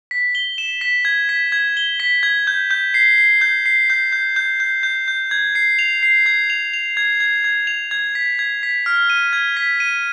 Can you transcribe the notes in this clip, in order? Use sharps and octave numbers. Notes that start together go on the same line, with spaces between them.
B6
G7
E7
B6
G#6
B6
G#6
G7
B6
G#6
G6
G6
C7
C7
G6
C7
G6
G6
G6
G6
G6
G6
G#6
C7
F7
C7
G#6
F7
F7
G#6
G#6
G#6
F7
G#6
B6
G#6
B6
F6
D#7
G#6
B6
D#7